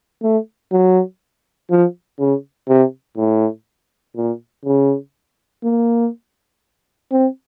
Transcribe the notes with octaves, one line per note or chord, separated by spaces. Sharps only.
A3
F#3
F3
C#3
C3
A2
A#2
C#3
A#3
C4